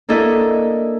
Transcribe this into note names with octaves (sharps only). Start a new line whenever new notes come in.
A#3 D4 E4 A4 D#5 E5